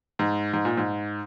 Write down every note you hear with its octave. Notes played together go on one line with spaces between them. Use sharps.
G#2
G#2
A#2
G#2